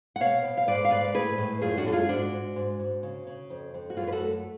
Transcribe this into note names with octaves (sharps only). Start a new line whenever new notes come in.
F#5
B2 C#5 F5
B2
F5
G#2 B4 D5
F5
G#2 B4 D5
A2 G#4 B4
A2
F#2 F4 G#4
D4 F#4
F#2 A4
F4 G#4
G#2 D4 F#4
G#2
G#2
G#2
C#3
C#3
F2
F2
F#4
F#2 F4 G#4
B4
F#4 A4
A3